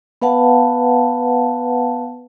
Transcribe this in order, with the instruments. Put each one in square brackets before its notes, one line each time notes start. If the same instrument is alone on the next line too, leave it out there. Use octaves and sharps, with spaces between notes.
[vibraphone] B3 B4 F5 F#5 A5